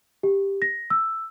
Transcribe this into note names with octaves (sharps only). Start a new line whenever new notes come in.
G4
A#6
E6